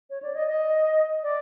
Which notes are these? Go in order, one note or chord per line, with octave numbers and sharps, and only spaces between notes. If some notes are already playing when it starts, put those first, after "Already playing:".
C#5
D5
D#5
D#5
D5